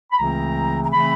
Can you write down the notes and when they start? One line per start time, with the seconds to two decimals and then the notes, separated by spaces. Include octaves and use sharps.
0.12 B5
0.19 C#2 C#3 E3 A3 C4 A#5
0.84 A#5
0.92 C#3 E3 A3 C4 B5